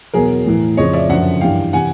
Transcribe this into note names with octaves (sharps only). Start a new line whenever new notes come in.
E2 B2 F#3 G#4 A#4
A2 E3
F2 C#3 F3 C#5 D#5
D5 E5
F#2 D3 F3 E5 F#5
G2 E3 F5 G5
C3 E3 F#5 G#5